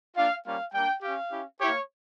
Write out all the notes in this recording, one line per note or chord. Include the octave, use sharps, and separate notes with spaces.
A#3 D4 F4 F5
G3 A#3 C#4 F4 F5
G3 A#3 D4 G5
C#4 G4 F5
C#4 E4 G4
A#3 E4 G4 C#5